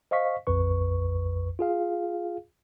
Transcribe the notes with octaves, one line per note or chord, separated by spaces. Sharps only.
C5 D#5 F5 C#6 B6
A#1 F2 B4 C#6
F4 G#4 F5